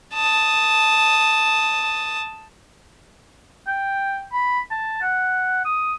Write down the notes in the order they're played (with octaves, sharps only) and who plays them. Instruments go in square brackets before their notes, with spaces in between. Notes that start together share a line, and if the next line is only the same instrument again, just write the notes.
[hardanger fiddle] A5 D#6
[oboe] G5
B5
A5
F#5
D#6